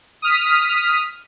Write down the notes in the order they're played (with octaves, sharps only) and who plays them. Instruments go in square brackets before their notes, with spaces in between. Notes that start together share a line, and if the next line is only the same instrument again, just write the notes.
[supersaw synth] D#6 F6 B6